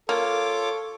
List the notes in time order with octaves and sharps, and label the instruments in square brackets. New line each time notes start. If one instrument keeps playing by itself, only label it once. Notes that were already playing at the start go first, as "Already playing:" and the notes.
[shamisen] A#3 [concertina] F4 C#5 D6 [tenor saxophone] A4